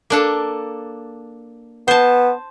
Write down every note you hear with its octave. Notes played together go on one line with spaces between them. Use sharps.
A#3 D4 A4
B3 C5 A5